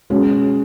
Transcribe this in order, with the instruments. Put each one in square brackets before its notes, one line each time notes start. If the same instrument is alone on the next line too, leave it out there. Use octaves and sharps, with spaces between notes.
[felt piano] B2 G#3 C#4 F#4